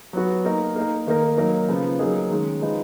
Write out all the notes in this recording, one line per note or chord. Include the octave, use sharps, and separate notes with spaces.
F#3 B3 F#4
A#3 D#4 A#4
A#3 D#4 A#4
D#3 A#3 D#4 A#4
F#3 A#3 D#4 A#4
C#3 F3 B3
F#3 A#3 D#4 G#4
D#3 G#3 C#4
F3 G#3 D#4 G#4 B4